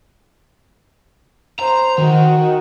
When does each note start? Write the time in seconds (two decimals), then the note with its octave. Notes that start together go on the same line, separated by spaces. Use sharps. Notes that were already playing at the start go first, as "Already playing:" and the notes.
1.60 C5 A#5
1.98 D#3 F#4